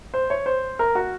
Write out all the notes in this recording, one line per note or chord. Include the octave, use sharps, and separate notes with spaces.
C5
C#5
C5
A#4
F#4